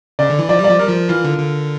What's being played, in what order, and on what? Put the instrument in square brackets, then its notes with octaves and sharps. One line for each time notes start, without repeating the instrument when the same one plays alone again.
[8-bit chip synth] C#3 [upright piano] D5
[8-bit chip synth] D3
E3
[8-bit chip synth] F3 [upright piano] D5
[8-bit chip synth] G3
[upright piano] D5
[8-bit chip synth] F3
[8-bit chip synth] G3 [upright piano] A#4
[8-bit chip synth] F3
[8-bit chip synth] E3 [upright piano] F4
[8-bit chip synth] D3
D3